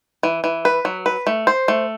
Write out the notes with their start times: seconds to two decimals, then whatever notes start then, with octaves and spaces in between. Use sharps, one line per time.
0.23 E3
0.44 E3
0.65 B4
0.85 F#3
1.06 B4
1.27 A3
1.47 C5
1.68 A3